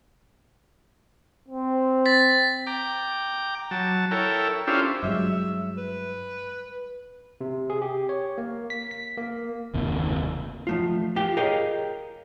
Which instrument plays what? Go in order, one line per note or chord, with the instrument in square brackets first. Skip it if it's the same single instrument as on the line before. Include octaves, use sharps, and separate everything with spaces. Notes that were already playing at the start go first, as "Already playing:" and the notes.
[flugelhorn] C4
[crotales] A6 B6
[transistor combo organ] G5 A#5 D6
F#3 A5
E4 A4 A#4 C#5 G5
C#4 D4 E4 F4 G4 C5
[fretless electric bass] G2 F#3 G#3 [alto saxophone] E5
[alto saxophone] B4
[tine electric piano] C3
G#4
G4
C#5
A#3
B6
B6
A#3
[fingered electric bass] F#1 D#2 C3
[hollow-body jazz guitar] F3 A3 F4
F4 G4 G5
G#4 A#4 C#5 D#5 F5 G5